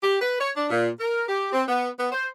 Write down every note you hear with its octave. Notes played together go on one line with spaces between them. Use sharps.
G4
B4
C#5
D4
A#2
A#4
G4
C4
B3
B3
C5